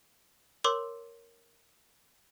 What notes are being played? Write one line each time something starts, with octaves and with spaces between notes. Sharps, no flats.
A#4 C#5 C6 D6 E6 F#7